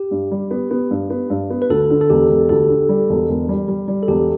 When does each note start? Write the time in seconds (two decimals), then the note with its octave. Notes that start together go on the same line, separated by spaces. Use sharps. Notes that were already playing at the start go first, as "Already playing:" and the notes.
Already playing: G4
0.11 G2
0.31 G3
0.51 B3
0.71 B3
0.91 G2
1.10 B3
1.30 G2
1.50 B3
1.62 B4
1.70 D2 A4
1.90 D3
2.01 A4
2.10 E1 G4
2.30 E1
2.49 D2 A4
2.69 D3
2.89 G3
3.10 E1
3.29 E1
3.49 G3
3.68 G3
3.88 G3
4.03 A4
4.08 E1 G4